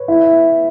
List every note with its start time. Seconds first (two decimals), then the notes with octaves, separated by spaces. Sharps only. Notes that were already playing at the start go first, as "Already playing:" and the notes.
Already playing: B4 C#5
0.08 E4